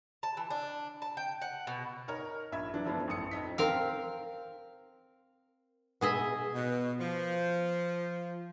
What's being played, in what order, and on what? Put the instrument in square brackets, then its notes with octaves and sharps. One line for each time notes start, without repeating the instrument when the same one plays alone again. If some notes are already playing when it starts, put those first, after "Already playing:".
[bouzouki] A5
E3
D4
A5
G5
F#5
B2
[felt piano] D#4 A#4 C#5 A#5
A#1 E5 B5 G#6
E3 F#3 D4
F#2 E3 F3 A3 B3 D4
A1 F#2 D#6 C#7
F2 D#4 B6
[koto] C4 A#4 F5
B2 G#4 D#5 E5
[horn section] B2
F3